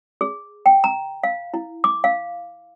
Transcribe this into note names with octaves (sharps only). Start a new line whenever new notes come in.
G#4
G5
A#5
F5
E4
D6
F5